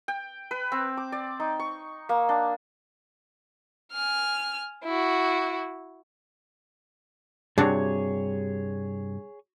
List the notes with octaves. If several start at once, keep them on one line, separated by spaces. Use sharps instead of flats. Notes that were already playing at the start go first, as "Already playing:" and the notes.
G5
B4
C4
D6
D5
D#4
C#6
A#3
D4
G#5 F6
E4 F#4
G2 C3 D4 F#4 G#4 C#5